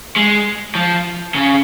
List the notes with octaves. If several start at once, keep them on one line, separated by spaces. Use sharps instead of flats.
G#3
F3
C#3